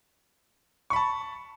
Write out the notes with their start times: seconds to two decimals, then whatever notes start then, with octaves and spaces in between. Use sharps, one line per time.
0.90 C#6
0.93 B5
0.96 A5